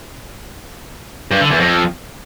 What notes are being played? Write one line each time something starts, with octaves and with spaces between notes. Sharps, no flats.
G2
D3
E2
F2